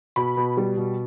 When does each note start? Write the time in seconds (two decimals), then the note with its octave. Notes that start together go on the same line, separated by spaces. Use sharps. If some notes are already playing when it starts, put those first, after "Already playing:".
0.16 B2 B5
0.37 B2
0.57 G3
0.77 B2